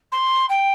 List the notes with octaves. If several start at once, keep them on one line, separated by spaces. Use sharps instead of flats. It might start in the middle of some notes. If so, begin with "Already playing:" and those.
C6
G5